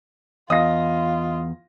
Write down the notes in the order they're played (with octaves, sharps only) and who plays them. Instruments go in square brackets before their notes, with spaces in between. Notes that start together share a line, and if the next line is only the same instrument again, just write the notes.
[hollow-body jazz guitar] E2 [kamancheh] F4 [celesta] D#5 F5 [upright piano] D#6 A#6